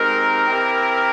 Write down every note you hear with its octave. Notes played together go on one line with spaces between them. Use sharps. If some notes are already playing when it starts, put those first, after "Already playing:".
Already playing: G#3 C4 D#4 G4 A#4
C4 E4 G4